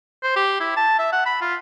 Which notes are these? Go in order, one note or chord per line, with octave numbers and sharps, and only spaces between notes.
C5
G4
E4
A5
E5
F#5
B5
F4